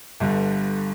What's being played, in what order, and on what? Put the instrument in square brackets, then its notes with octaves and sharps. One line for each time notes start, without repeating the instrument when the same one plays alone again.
[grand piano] G1 G2 D3 G3